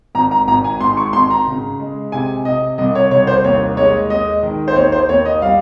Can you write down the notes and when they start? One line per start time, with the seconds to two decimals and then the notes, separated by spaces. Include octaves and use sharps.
0.15 G#1 A#5
0.31 A#5
0.48 G#1 A#5
0.64 G#5
0.81 G#2 C6
0.97 C#6
1.13 G#1 C6
1.30 A#5
1.47 C#3
1.80 G#3
2.12 C3 G#5
2.45 C3 D#5
2.78 C2 D#5
2.95 C#5
3.11 C2 C#5
3.27 C5
3.44 D#2 C#5
3.77 G#3 C#5
4.10 G#3 D#5
4.43 D#3
4.68 C5
4.76 D#2 C#5
4.92 C5
5.09 D#2 C#5
5.26 D#5
5.42 G3 F5